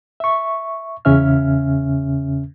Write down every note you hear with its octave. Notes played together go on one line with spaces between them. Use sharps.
E5 C#6
E2 C#3 C#4 E5 F6